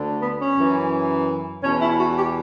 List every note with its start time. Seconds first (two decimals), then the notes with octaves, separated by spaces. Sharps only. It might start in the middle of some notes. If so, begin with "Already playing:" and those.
Already playing: D2 D3
0.21 B3
0.39 C#4
0.57 F#2 E3
1.63 E2 B2 C#4
1.81 E4
1.99 F#4
2.16 G4